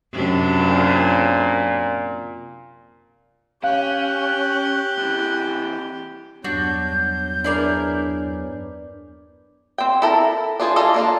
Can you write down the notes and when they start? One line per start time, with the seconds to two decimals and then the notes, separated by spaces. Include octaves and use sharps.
0.13 F#2 C3 D4
0.60 A#2
3.64 C#4 G4 F5 F#6
4.98 C3 E3
6.44 E2 G2 F#3 G3 D4 F#4 G6
7.44 D4 E4 G#4 A#4 B4 D5
9.78 C4 G5
10.02 E4 A4 A#4 A#5
10.60 D4 F4 G#4 C5
10.76 F4 A4 D5 D#5 F5
10.94 A#3 D4 F4